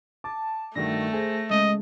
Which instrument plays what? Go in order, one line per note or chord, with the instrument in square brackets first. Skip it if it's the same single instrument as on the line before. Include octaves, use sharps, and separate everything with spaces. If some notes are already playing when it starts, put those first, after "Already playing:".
[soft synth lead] A5 [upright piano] D6
[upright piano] G2 D#3 F#4 [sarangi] A3 [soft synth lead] A#6
[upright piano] G#4 A4 C5
[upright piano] C#3 [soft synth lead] G#3 [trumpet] D#5